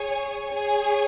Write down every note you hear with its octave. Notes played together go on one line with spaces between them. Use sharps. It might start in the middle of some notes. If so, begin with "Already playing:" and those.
Already playing: G#4 C#5 G#5
G#4 C#5 G#5